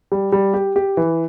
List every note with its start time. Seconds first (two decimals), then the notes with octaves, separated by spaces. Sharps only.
0.12 G3
0.32 G3
0.54 G4
0.76 G4
0.97 E3